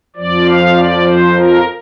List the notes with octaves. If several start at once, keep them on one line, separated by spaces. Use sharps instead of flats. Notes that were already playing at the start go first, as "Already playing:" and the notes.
F2 F3 D5
F5
D5
C5
A#4